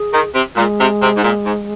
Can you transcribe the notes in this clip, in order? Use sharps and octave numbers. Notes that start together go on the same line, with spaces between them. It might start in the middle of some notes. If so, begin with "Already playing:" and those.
Already playing: G#4
D#3
C3
A#2 G#3
C3
C3
G#2
A#2
G#2